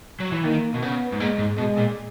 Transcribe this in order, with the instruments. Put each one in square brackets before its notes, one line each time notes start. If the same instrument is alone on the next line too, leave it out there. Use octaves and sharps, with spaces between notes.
[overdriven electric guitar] F#3
E3
[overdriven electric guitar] D#3 [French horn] A#3
[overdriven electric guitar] B2
[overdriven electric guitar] C#3 [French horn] B3
[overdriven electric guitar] G#2
[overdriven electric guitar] A#2 [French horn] G#3
[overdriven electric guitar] G#2
[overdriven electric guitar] B2 [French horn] G#3
[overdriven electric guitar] A#2